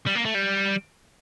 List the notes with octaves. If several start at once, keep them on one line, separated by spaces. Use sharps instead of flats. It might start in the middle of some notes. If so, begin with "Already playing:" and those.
G3
A#3
A3
G3